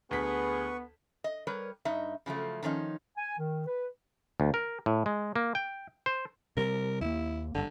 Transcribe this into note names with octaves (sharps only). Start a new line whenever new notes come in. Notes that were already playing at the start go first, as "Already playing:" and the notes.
D2 B3 G#4 B4 C#6 B6
D#5
G3 A#4 B4 C#5
G2 D#4 D#5 E5
C#3 F3 F#3 A3
D#3 F3 C#4 D#4
G#5
D#3
B4
D2
A#4
A2
G#3
A#3
G5
C5
C3 G3 A#4
D#2 A#3 E4
F#1 G2 D3